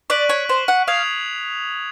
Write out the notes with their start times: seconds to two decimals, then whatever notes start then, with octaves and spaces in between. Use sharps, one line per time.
0.10 D5 C#6 F#6 B6 D7 F#7
0.29 C#5
0.49 C5
0.68 F#5
0.88 F5 D#6 G#6 C7 F7